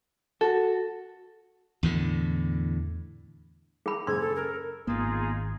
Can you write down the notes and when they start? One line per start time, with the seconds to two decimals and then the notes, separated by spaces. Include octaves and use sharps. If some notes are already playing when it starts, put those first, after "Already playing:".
0.41 F#4 A4
1.83 E2 A2 D3
3.86 G#4 B5
4.07 F#1 G#4 C6 E6 G#6
4.20 A4
4.36 A#4
4.87 G#1 A#3 B3 D#4 F4 G#4